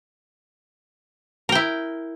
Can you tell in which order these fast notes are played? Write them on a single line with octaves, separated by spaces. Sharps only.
A#4 G5 E4